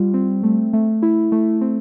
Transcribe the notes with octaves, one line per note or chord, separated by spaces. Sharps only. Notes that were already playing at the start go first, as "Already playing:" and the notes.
Already playing: G3 F4
C4
A3
A3
E4
A3
C4